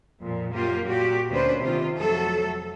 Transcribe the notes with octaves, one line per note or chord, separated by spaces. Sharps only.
F2 A#2
F#2 A#3 F4 G4
A#2 F#4 G4
D2 A#3 C#4 D4 B4 C5
C3 D#3 F4
F2 F#3 A3 A4